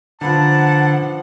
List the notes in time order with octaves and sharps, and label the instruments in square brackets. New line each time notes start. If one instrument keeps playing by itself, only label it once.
[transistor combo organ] D3 [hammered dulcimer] F3 B4 A#5 [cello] F#5 [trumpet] A5